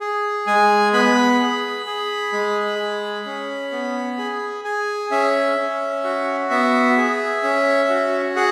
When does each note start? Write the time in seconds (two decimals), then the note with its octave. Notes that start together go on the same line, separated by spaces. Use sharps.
0.01 G#4
0.47 G#3 G#5
0.93 B3 B5
1.40 G#4
1.86 G#4
2.33 G#3
2.79 G#4
3.26 C#4
3.72 B3
4.18 G#4
4.64 G#4 G#5
5.11 C#4 E5
5.57 C#4
6.04 F#4
6.50 B3 E5
6.97 G#4
7.43 C#4
7.89 F#4
8.36 G#4 F#5